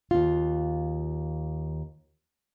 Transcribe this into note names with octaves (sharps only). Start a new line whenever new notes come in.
D#2 F4